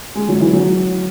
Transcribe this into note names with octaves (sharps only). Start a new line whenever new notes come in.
G#3
F#3
E3
F#3